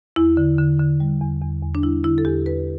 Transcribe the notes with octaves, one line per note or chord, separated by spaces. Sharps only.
E2 E4
D3
D3
D3
G3
E2
E2
E2
D4
G3 E4
D3 E4
A4
E2 G4
E2 B4